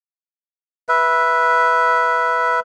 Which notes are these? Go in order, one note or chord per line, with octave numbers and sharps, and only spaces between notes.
B4 E5